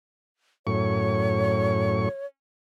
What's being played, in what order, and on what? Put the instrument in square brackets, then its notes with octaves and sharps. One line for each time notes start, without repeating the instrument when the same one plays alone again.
[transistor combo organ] F#2 A2 C#6 [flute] C#5